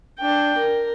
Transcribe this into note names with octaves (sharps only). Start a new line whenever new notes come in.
D4 G5
A#4